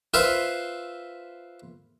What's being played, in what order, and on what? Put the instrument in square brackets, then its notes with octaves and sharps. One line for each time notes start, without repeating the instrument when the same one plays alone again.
[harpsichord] F4 B4 C5 E5 F5